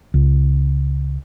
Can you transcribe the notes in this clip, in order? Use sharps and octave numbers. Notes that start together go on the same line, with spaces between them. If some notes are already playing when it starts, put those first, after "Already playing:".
C#2